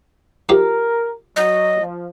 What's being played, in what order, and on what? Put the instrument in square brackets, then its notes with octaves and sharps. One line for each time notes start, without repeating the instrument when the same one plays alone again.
[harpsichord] F3 D#4 G4 [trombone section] A#4
[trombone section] F#3 [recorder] D#5
[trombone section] F3